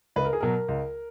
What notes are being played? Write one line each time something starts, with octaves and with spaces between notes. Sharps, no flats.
C#2 B4
A#4
G#4
B2 F#3 A#4
C#2